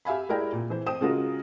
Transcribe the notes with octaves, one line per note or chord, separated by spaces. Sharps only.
G4 E5 F5 G#5 B5
G#3 E4 G4 A#4 D5 G5
A#2
E3 C5
C5 G5 D#6 E7
C#3 G#3 F4 F#4 A#4